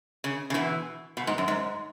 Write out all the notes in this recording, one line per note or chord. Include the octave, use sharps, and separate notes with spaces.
C#3
C#3
B2 E3
B2
G#2
F#2
G#2